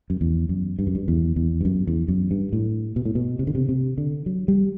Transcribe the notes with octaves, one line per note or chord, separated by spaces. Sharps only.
F#2
E2
F#2
G2
F#2
G2
E2
E2
G2
F#2
E2
F#2
G2
A2
B2
A2
B2
C3
D3
C3
C3
D3
F#3
G3